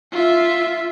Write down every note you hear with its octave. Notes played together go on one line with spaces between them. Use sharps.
F4 E5